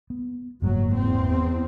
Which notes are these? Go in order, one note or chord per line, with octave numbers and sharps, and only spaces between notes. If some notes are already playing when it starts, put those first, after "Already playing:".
B3
F#1 G#2 F#3 A#3
E2 C4